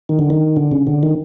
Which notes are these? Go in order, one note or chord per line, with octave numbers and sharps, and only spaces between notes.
D#3
D3
D#3
D3
C#3
D3
D#3